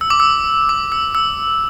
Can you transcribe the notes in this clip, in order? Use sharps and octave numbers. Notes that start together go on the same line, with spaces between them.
E6
D6
E6
D6
E6
E6